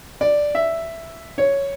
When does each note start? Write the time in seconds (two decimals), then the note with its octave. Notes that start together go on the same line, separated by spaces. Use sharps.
0.21 D5
0.55 E5
1.38 C#5